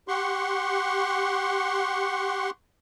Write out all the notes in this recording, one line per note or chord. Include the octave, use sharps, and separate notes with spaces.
G4 F#5 C6 C#6